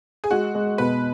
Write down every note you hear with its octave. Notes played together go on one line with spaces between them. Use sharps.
G#4
G#3 F#4
G#3
B2 B4